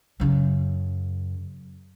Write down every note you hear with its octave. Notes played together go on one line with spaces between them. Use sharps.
F#2 C#3